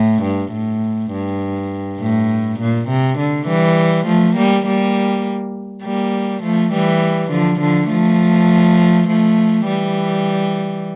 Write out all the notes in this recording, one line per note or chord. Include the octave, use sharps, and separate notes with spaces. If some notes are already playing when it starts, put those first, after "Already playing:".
Already playing: A2
G2
A2
G2
A2
A#2
C3
D3
E3 G3
F3 A3
G3 A#3
G3 A#3
G3 A#3
F3 A3
E3 G3
D3 F3
D3 F3
F3 A3
F3 A3
E3 G3